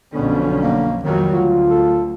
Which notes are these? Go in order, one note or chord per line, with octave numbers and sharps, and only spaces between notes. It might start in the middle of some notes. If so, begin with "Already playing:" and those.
B1 F2 D3 B3 C#4
A#3
F2 D#3 F#3 G3
D2 F4
A4